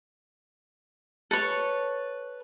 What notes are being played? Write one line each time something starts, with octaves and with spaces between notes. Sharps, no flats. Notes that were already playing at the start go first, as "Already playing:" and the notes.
A4 B4 C#5